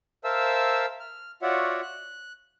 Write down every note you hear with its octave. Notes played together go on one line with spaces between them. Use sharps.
A#4 C5 E5 F5 A5 E6
F6
F4 F#4 C#5 D5 E5 F#5
F#6